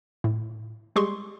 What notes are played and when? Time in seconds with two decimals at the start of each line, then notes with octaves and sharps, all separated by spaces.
0.24 A2
0.96 G3 G#3 G4 G#4 C6 C#6